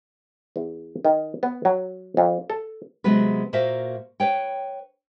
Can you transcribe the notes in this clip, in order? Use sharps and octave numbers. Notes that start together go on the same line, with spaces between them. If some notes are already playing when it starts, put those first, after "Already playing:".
E2
D#3
B3
F#3
F2
A4
C3 F#3 G#3 B3 F#4 B4
A#2 A#3 F#4 C5 E5 F5
B4 C#5 G5